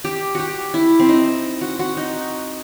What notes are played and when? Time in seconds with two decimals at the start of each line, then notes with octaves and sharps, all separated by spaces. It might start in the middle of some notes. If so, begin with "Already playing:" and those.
0.04 G4
0.35 F#4 G4
0.74 E4
0.99 C4
1.09 D#4
1.61 F#4
1.79 F#4
1.97 D#4